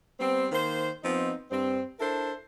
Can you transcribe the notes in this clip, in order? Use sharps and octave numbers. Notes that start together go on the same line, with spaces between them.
G3 B3 C4
D#3 A#3 C5
F3 B3 C4 D#4
G2 C4
D4 E4 A4 A#4 C5